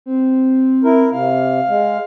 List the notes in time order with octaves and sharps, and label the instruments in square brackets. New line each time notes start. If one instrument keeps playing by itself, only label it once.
[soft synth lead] C4
[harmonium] E4 A#4
[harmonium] C3 [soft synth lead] F5
[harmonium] G#3